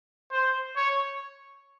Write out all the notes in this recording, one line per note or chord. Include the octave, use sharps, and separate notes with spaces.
C5
C#5